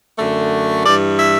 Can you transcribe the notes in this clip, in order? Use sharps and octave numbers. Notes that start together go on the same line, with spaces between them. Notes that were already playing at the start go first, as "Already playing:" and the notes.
F#2 D3 A3
G2 E3 G3 D5
E5